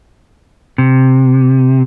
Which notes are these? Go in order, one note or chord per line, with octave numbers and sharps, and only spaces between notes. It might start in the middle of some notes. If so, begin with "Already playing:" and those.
C3